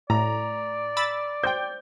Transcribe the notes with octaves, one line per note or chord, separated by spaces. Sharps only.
A2 D5 A#5
B5 E6 A6
C5 G5 G6